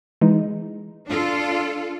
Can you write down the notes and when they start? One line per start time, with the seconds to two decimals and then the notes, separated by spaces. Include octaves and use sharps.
0.21 E3 G#3 D#4
1.07 D4 F4 A4